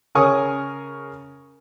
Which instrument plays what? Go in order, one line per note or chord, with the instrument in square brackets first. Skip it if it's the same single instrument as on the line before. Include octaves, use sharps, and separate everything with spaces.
[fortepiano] C#3 A#4 C#5 G#5 C#6 D#6